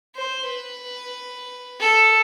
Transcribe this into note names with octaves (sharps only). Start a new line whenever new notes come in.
C5
B4
A4